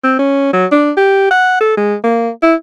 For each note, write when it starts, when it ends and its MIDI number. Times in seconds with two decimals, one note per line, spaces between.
0.04 0.17 60
0.19 0.50 61
0.53 0.65 54
0.72 0.91 62
0.97 1.30 67
1.31 1.56 78
1.61 1.76 69
1.77 1.95 56
2.04 2.29 58
2.42 2.54 64